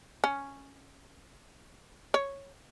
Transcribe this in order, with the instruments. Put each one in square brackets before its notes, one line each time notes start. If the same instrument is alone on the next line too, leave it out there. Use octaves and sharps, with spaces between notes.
[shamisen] C#4
C#5